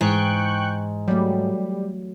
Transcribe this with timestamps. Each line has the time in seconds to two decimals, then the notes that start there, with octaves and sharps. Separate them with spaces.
0.01 G#2 E3 G5 C#6 F#6
1.08 F#3 G3 A3